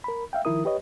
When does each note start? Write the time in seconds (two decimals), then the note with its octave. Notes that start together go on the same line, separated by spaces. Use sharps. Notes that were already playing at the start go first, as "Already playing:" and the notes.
0.04 A#4 B5
0.33 E5 F5 G5
0.45 D#3 F3 E4 A#4 D#6
0.65 G4 B4 C#5 D#5